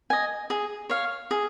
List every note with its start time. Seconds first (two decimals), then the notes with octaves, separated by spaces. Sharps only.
0.10 D#5 G#5
0.50 G#4
0.90 C#5 F5
1.31 G#4